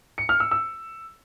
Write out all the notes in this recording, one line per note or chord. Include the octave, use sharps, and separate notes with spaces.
C#7
F6
E6
E6